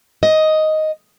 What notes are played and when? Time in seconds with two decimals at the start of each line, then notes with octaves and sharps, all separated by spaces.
0.23 D#5